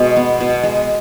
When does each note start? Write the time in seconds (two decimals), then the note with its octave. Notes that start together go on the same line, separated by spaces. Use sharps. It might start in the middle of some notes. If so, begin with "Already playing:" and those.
Already playing: B2 G#3 F#4
0.17 B3
0.40 B2
0.63 G#3